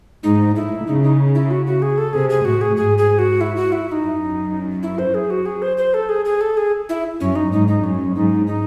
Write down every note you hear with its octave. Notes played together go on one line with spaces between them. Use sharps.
G#2 D#4
A2 E4
C#3 D#4
D#4
E4
F#4
F#4
G#4
A4
C3 G#4
G#4
A2 F#4
G#4
G#2 G#4
G#4
F#4
E4
F#4
E4
E4
D#4
F#2
E4
C5
G#4
F#4
G#4
C5
C5
A4
G#4
G#4
A4
G#4
E4
F#2 C#4
D#4
G#2 D#4
D#4
F#2 C#4
G#2 D#4
D#4